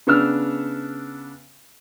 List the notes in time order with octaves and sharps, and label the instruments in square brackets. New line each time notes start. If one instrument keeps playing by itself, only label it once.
[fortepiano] C#3 B3 D4 E6 F6